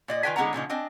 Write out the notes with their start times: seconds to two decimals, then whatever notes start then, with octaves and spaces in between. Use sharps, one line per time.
0.08 A#2 D5 D#5
0.23 D#3 F4 B4 G5 G#5
0.36 D3 G#3 B3 E4 F#5 A#5
0.53 A#2 C#3 F3 D#4
0.70 C4 D4 D#5 G#5